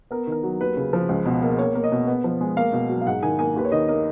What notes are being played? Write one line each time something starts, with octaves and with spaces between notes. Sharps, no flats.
B3 A#4
D#3 A#4
F#3
D#2 B4
C#3
F3
C#2
B2
A#3
A#3 C#5
A#3
D#5
B2
B3
F3
G#3
A#3 F5
B2
F#3
F5
G#2 F#5
D#3 G#5
A#3 G#5
D#2 B4
C#5
D#3 D#5
A#3 D#5